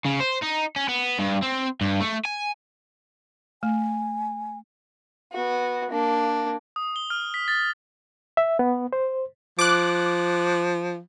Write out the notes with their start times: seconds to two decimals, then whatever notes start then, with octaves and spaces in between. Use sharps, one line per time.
0.05 C#3
0.21 C5
0.43 D#4
0.76 C#4
0.89 B3
1.19 G2
1.42 C4
1.81 G2
2.00 A3
2.25 G#5
3.63 A3 G#5
5.33 B3 F#4
5.91 A#3 D4
6.76 D#6
6.96 G7
7.10 F6
7.34 B6
7.48 A6
8.37 E5
8.59 B3
8.93 C5
9.59 F3 D6 F#6